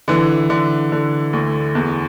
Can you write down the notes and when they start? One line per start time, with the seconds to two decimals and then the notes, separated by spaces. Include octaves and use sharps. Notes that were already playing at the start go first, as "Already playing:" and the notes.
0.08 D3 E3
0.50 D3
0.92 D3
1.33 D2
1.75 E2